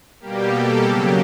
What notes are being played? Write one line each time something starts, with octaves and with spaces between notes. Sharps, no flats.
B2 G3 A#3 G4
A4
C#3 F#3 A#3 G4